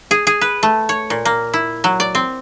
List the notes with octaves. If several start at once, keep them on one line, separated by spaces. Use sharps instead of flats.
G#4
G#4
B4
A3
C#5
A#2
A#3
E4
F#3
D5
C4